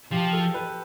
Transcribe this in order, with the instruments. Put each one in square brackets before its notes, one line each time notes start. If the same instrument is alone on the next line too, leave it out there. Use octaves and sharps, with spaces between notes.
[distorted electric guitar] F3 [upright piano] G4
[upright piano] A4
B4